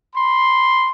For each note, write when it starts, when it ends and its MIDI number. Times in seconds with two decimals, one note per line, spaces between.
0.14 0.90 83
0.14 0.90 84